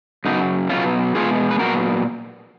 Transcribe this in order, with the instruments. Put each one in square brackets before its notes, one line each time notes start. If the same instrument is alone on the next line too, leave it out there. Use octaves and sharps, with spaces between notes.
[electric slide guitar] F#2 C#3 F#3 B3 D#4
B2 F#3 B3 C#4 F4
B2 G#3 B3 F4 G#4
B4
A#2 F#3 B3 F#4 A#4